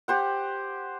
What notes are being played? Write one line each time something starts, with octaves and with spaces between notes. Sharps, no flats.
G4 C5 F#5